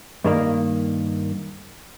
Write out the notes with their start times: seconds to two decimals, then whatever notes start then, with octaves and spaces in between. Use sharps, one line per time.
0.24 G2 D#3 A#3